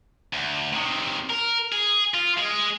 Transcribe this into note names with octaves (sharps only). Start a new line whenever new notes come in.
D2
C3 D#3
A#4
G#4
F4
G#3 G#4